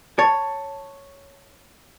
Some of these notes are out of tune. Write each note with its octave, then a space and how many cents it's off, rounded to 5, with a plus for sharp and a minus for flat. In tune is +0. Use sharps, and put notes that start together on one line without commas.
C#5 +0 A5 +10